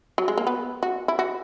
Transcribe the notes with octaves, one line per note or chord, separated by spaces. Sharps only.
F#3
G#3
A#3
B3
F#4
E4
F#4